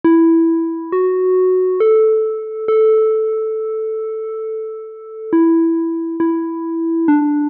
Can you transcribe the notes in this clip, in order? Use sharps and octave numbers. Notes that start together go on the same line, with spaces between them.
E4
F#4
A4
A4
E4
E4
D4